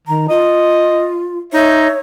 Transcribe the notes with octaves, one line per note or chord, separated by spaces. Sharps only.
D#3 A#5
F4 D#5
D#4 C#5 E5